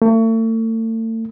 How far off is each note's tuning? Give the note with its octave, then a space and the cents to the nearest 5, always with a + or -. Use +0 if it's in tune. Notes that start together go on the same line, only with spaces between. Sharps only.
A3 +40